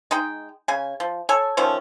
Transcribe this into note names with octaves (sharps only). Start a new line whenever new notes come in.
G#3 D#4 G5
C#3 G#5
F3
A4 C#5 G#5
D#3 F3 A3 C#4